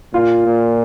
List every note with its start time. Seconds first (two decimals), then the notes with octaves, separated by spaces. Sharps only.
0.13 A#2 F4
0.46 A#2